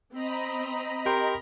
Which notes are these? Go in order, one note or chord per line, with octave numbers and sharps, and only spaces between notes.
C4 D#5 A#5 B5
G4 A#4 G5 C6